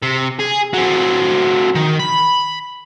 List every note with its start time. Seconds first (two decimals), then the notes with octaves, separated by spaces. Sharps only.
0.02 C3
0.40 G#4
0.74 F#3 C4
1.75 D#3
1.99 B5